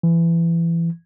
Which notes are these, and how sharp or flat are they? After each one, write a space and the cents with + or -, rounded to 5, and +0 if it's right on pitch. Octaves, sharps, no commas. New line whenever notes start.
E3 +25